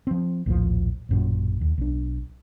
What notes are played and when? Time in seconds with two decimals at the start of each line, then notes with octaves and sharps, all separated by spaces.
0.07 F3 C4
0.46 A#1 D#2 A2 F3
1.09 A1 F#2 A#2
1.61 D#2
1.78 B1 D4